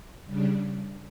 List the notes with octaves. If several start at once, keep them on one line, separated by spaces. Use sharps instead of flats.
C#3 G3 D4